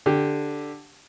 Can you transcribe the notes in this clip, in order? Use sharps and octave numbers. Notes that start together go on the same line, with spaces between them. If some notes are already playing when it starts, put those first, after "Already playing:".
D3 G4